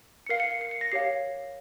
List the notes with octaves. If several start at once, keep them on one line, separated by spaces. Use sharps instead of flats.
C#7
A#4 F5 C7
C#7
C7
C7
C#7
A#6
G4 C#5 F5 C7